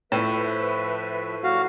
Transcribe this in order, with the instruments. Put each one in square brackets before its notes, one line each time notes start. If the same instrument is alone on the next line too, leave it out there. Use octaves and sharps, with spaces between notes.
[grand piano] A2 [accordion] F3 B4 E5
[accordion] F#3 G3 A#3 [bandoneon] F#4 F5